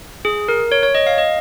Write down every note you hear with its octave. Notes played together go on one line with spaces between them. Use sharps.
G#4
A#4
C#5
C#5
D#5
F5
D#5